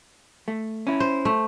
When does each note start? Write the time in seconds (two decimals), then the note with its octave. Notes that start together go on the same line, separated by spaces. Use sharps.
0.48 A3
0.87 C#4 E4
1.00 C5
1.25 A3